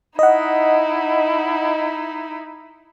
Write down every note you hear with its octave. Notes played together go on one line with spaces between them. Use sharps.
D#4 E4 D#5 F#5